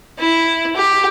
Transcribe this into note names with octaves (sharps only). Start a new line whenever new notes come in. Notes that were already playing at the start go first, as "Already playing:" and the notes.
E4
G4